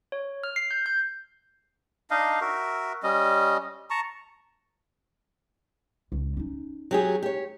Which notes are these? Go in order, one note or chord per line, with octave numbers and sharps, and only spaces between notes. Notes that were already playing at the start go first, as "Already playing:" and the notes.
C#5
F6
C7
G6
G6
D4 D#4 D#5 F5
F#4 A#4 E5
G3 C#4 D#5
A5 A#5 C#6
C#2
C#4 D#4
F#3 G4 G#4
G4 C#5